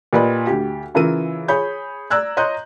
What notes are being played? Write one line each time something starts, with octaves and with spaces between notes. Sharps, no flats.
A#2 G4 B4 D5 D#5 B5
D2 G4
C#3 E3 F4 A#4 E6 D#7
G#4 C#5 B5 G6
D5 A#5 E6 F#6 G#6
C#5 D#5 A#5 C6 F#6 G6